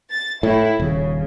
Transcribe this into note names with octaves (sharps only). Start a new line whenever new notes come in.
A6
A2 E4
D#1 C#3